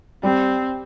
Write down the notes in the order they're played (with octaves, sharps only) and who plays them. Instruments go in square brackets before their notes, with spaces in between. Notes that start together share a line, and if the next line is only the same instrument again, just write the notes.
[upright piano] G3 [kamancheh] C4